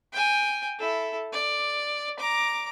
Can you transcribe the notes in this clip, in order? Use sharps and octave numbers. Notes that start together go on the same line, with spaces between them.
G5 G#5
E4 A4
D5
A#5 D6